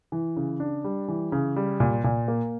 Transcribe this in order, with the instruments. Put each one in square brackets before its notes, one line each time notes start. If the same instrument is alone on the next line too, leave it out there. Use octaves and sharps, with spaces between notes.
[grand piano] E3
C#3
D4
G3
E3
C#3
G3
A#2
A#2
A#3